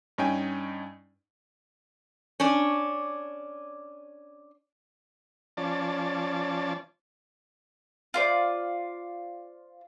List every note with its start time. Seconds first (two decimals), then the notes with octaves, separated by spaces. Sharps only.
0.18 G2 C#4 D#4 G5 G#5
2.40 C#4 D4
5.57 F3 C#4 D5 A5
8.14 F4 C5 D5